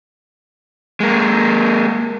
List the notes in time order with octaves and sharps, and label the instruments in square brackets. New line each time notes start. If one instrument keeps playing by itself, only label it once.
[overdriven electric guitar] G#3 A#3